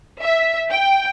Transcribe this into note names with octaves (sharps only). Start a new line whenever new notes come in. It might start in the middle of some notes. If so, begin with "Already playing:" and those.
E5
G5